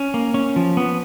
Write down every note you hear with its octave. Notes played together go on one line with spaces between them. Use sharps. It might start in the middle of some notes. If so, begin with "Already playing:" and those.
Already playing: C#4
A#3
C#4
F3
B3